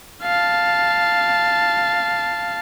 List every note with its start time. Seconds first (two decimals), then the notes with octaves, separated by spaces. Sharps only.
0.23 F5 A5